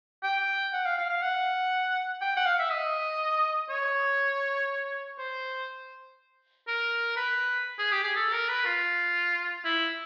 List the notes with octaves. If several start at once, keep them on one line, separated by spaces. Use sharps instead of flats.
G5
F#5
F5
F5
F5
F#5
G5
F#5
F5
E5
D#5
C#5
C5
A#4
B4
G#4
G4
G#4
A4
A#4
B4
F4
E4